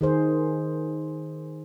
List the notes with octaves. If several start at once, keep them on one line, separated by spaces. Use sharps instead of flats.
D#3 G#4 C5